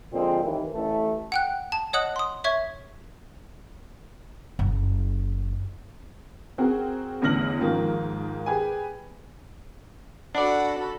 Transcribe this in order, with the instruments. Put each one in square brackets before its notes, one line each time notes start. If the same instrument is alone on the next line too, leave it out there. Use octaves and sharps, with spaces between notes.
[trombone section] A#2 D3 F3 G#3 C4
D#2 E3
A1 E3 A3
[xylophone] F#5 G5 F#6
A5
C#5 D#5 F#5 D#6 F#6 F#7
C6 D#6
C#5 E5 C#6 G#6
[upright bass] F#1
[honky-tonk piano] C4 F#4 G#4 A#4
A1 E2 D3 F6 A#6 F#7
G#2 D#3 F3 A#3
G4 G#4 B4 G#5
[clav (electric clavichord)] D4 D5 [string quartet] F#4 A4 B5 [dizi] F#5